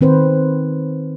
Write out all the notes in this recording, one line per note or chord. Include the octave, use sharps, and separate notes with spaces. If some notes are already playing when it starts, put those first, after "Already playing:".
D#3 C4 B4 C5